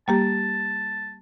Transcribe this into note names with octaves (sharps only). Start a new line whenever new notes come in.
G3 A#3 G4 A5